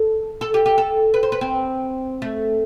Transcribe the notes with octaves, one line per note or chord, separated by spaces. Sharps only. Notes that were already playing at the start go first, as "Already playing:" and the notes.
Already playing: A4
A4
G4
G4
A4
B4
C5
B4
C4
A3